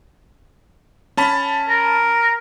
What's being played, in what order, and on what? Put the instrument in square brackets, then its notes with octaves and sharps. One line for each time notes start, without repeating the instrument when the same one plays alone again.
[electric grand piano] C#4 A5 B5
[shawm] A#4